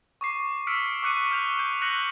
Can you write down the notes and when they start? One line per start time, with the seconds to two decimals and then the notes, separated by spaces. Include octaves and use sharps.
0.21 C#6 D6 C7
0.67 E6 F6 B6 C#7 D7
1.03 C#6 D6 F#6 C#7 D#7
1.31 F6 G6 F7
1.59 G6
1.82 F#6 A#6 C#7 F#7